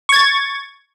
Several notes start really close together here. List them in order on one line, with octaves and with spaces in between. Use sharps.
C#6 G#6 A6